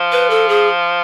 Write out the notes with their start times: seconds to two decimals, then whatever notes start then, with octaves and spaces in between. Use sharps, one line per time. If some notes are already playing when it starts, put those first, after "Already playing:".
Already playing: F3
0.12 B4
0.30 A4
0.49 G#4